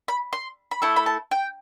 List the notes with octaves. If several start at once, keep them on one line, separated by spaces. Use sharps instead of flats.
B5
C6
B5
A3 E4 A4 A5
B5
A5
G5